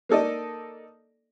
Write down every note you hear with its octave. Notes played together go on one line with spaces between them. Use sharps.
A#3 D#4 A4 D5 D#5